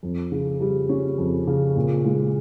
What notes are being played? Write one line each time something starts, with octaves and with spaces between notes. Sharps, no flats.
F2
C#3
G3
C#4
F2
C#3
A#2
G#3